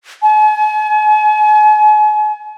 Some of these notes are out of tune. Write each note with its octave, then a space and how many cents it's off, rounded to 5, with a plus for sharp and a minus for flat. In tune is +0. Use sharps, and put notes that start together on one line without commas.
G#5 +40